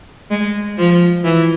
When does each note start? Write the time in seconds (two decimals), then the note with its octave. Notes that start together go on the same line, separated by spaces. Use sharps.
0.30 G#3
0.78 F3
1.24 E3